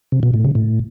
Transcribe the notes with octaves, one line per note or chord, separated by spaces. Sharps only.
C3
B2
A2
C#3
A2